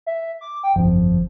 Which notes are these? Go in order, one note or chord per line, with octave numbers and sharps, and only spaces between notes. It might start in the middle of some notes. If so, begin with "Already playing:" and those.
E5
D6
G5
G1 F2 F3